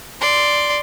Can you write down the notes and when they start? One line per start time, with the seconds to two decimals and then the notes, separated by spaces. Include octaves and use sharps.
0.21 D5 C6